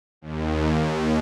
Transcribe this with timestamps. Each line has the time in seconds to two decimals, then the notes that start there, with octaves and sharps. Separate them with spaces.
0.22 D#2